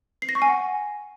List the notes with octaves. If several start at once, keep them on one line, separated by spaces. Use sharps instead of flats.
C7
A#6
C#6
G#5
F#5